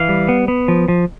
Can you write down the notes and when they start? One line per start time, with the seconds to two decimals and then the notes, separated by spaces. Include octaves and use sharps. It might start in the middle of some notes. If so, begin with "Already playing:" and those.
Already playing: E3 F5
0.09 G3
0.29 B3
0.48 B3
0.68 F3
0.88 F3